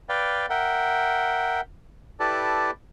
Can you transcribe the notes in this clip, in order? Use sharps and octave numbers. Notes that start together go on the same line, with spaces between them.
B4 D5 F5 G5
A#4 E5 F#5 G5
E4 G4 A4 B4 D5 A5